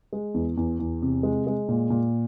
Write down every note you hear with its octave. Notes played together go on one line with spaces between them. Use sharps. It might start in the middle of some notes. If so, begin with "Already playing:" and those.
G#3
E2
E2
E2
C3
G#3
G#3
A#2
A#2